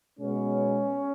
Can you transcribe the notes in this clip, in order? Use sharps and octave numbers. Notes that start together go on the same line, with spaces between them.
B2 G#3 B3 C#4